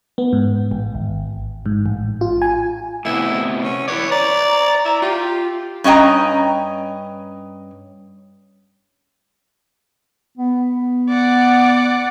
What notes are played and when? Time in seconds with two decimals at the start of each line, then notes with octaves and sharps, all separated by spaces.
0.18 B3
0.33 G#2
0.71 A1
0.95 G#1
1.66 G#2
1.86 A1
2.21 F4
2.42 G#5
3.05 A2 C3 B3 E4
3.64 C#4
3.88 E4 B4 C#5 D5
4.11 D5 A#5
4.85 E4
5.02 F4 G4
5.84 G2 C#4 D#5 G5 A#5
10.38 B3
11.09 D5 F#5